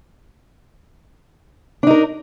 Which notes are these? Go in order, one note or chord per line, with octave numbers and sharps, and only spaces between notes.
D4 D#4 A#4